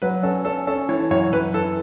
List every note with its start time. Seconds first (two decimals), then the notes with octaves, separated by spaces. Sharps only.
0.02 F#3 B4
0.23 C#4 A4
0.45 C#4 A4
0.67 C#4 A4
0.89 E3 C#5
1.11 F#2 C#5
1.33 F#2 B4
1.54 E3 A4